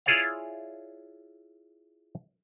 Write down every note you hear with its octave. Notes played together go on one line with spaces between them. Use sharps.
E4 F4 G#4 C#5 D5 F5